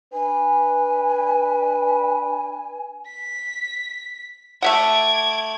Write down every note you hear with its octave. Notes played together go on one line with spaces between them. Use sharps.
D4 B4 G#5
B6
A3 E5 F#5 D6 G#6